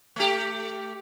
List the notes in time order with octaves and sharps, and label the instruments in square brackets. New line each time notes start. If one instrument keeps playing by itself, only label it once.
[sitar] A3 G4